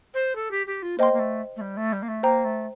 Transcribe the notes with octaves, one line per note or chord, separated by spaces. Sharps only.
C5
A4
G4
G4
F4
A#3 C5 D#5 G5 C6
A#3
A3
A3
G3
A3
G3
A#3
A3
A#3 C5 G5 A#5
A3